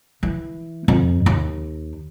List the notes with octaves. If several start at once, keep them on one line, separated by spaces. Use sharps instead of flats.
E3
F2
D#2